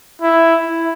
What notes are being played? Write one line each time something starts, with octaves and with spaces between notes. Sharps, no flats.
E4